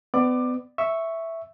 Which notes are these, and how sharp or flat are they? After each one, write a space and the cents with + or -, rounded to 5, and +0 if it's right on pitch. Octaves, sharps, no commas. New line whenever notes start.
B3 +35 D5 +20 D6 +15
E5 +0 C#6 +0